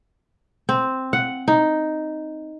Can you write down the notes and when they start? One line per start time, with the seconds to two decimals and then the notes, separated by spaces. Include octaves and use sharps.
0.69 C4
1.13 F#5
1.48 D#4